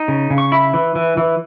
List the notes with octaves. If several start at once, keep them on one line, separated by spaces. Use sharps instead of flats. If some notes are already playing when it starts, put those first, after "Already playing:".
Already playing: D#4
C#3
C#3
C#6
E4 B5
E3
E3
E3